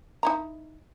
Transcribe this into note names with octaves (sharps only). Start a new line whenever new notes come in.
D#4 E4 A#5